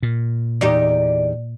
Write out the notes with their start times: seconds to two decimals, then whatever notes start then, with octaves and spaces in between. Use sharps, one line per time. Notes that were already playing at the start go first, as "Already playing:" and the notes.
0.03 A#2
0.61 E2 D#4 G4 D5